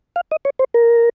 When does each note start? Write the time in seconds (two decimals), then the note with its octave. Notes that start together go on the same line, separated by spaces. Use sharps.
0.16 F5
0.31 D#5
0.45 C#5
0.59 C5
0.74 A#4